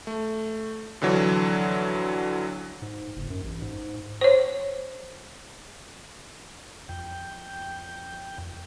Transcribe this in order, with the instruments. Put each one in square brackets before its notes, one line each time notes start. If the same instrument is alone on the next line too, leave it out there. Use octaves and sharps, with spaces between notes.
[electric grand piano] A3
F2 D3 E3 F#3
[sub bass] G#2
F#1
F#2
A1
G#2
[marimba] C5 C#5
[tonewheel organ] F2 G5